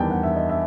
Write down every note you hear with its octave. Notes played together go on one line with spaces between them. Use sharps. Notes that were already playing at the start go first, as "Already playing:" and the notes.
Already playing: E2 D#3 G3 G5 A5
F#5
E5
D#5
E5